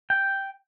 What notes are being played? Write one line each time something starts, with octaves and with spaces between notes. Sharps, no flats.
G5